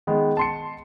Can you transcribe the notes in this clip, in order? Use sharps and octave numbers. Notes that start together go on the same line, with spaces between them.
D#3 G#3 B3
A5 C6 C#7